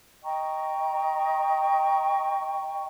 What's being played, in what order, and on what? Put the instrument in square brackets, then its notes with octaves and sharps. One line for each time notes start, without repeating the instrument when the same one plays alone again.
[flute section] D#5 G5 A#5 C#6